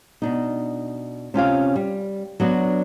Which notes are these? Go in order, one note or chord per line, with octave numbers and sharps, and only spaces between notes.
B2 D4 D#4
C3 C#4 F4 F5
G3
F#3 B3 D4 F#4